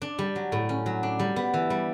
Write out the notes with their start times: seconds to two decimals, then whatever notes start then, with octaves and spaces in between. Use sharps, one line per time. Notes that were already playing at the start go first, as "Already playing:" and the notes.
0.02 D4
0.19 G3
0.36 F#3
0.52 A2
0.69 C#4
0.86 F#3
1.03 D4
1.20 G3
1.36 B3
1.54 E3
1.70 G3